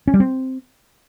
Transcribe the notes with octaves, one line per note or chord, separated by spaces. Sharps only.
C#4
G3
C4